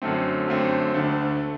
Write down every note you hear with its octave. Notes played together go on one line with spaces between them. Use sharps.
F#2 D3 A3 C4
F#2 D3 A3 C4
D2 D3 A3